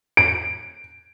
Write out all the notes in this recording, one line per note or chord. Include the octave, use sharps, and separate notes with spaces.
D7